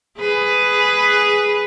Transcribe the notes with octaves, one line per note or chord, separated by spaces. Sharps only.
G#4 B4